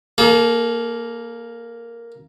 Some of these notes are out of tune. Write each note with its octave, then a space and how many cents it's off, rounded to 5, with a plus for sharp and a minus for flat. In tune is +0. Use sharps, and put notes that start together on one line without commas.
A#3 +0 A4 -40